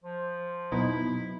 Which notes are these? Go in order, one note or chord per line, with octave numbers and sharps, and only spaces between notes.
F3
B2 F#3 A#3 B3 D#4 E4